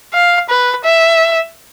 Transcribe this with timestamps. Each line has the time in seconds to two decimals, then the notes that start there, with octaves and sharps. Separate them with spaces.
0.14 F5
0.50 B4
0.85 E5